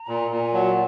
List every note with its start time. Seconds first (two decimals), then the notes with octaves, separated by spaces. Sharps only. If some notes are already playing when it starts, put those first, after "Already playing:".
Already playing: A#5
0.09 A#2
0.31 A#2
0.44 G#5
0.53 F#3 A5